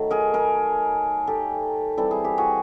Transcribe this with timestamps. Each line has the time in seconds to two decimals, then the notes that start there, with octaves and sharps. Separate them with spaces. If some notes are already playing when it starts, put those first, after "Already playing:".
Already playing: D#3 F#3 A3
0.10 G#4 A#4
0.34 G#4 A#4
1.27 G4 A4
1.97 E3 G3 C4 A4
2.11 G#4
2.24 G4
2.38 F#4 G#4